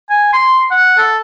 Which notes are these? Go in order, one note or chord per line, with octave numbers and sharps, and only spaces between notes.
G#5
C6
F#5
A4